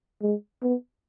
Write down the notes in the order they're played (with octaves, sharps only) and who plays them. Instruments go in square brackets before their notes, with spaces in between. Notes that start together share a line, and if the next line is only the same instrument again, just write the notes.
[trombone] G#3
B3